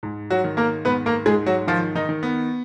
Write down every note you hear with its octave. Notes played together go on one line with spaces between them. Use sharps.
G#2
F#3 F#4
D#3
A#3 A#4
G#2 B3 B4
A#3 A#4
G#2 G#3 G#4
F#3 F#4
D#3 F3 F4
D#3 D#4
D#3
B3